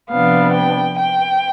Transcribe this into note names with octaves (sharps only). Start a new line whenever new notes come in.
C3 F3 B3 D4 F5
G5
G5